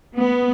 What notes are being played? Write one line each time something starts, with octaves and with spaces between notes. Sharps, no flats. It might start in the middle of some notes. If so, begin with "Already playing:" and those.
B3